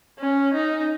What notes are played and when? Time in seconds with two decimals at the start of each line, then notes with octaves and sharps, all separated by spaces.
0.19 C#4
0.54 D#4